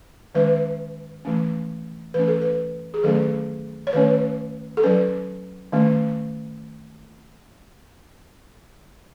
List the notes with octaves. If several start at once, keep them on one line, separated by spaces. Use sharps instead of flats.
D#3 G#3 C#4 B4
E3 A3 C#4
E3 A3 C#4 B4
A4
B4
G#4
D#3 F#3 A3 C#4 A4
C#5
D#3 A3 C#4 B4
A4
F#3 C#4 B4
D#3 A3 C#4